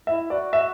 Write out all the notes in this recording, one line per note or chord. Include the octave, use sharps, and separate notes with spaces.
E4 E5
F#4 D5
E5